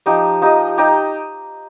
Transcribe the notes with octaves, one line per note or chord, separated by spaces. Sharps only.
F3 D#4 G4 D#5
F3 D#4 G4 D#5
D#4 G4 D#5